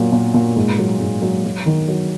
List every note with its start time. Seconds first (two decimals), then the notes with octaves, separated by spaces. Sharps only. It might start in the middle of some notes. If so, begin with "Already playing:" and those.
Already playing: A#2 F#3
0.12 A#2
0.34 A#2
0.56 G#2
0.78 F#3
1.00 G#2
1.22 F#3
1.45 F#3
1.66 D#3
1.88 F#3